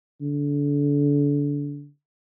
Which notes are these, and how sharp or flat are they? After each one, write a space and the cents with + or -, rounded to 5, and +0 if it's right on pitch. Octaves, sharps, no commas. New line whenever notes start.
D3 -30